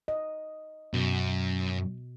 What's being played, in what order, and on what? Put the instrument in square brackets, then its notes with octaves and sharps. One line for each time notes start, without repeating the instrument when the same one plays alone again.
[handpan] D#5
[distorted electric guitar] F#2 [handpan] B2